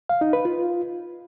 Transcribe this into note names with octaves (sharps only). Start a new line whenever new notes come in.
F5
D#4
B4
F4